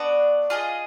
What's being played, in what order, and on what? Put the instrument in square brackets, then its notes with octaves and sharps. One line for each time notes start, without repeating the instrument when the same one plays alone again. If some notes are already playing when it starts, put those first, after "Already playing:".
Already playing: [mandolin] B3 D4 F#4 D5
F4 G#4 D#5